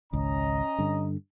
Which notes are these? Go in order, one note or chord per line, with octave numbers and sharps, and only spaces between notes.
G#1 C#2 C#4 D#5 A#5
G2 D3